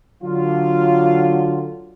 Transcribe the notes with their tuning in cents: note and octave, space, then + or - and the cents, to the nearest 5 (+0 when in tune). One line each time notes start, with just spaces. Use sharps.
D3 +0 F#3 +0 F4 -5